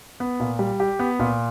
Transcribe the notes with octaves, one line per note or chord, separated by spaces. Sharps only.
B3
A#2
G3
G4
B3
A#2